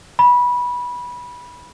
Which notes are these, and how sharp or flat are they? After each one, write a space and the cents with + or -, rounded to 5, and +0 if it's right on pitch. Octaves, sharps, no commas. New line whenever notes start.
B5 -20